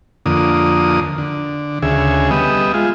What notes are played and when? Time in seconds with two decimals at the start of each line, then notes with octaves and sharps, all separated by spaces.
0.26 F2 D3 A#3 D#6
1.18 D3
1.82 D2 C#3 G#4 E5
2.31 G3 B3 D#5 E5
2.74 G#3 F4